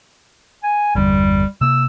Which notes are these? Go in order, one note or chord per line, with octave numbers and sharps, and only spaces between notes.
G#5
G1 E2 D3 G3
C3 A#3 E6